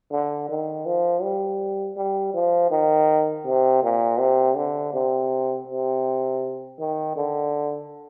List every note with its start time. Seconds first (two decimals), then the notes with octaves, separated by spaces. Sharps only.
0.11 D3
0.49 D#3
0.86 F3
1.22 G3
1.96 G3
2.34 F3
2.71 D#3
3.46 C3
3.83 A#2
4.19 C3
4.56 D3
4.93 C3
5.68 C3
6.79 D#3
7.16 D3